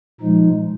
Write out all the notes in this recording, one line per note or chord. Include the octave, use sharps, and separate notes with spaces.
A#2 F3 G#3 D#4